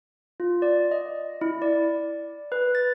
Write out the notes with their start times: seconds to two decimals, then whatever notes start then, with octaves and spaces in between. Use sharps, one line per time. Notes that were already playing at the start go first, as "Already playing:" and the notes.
0.40 F4
0.62 D5
0.91 D#5
1.41 E4
1.62 D5
2.52 B4
2.75 A6